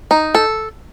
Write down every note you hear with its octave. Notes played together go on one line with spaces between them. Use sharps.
D#4
A4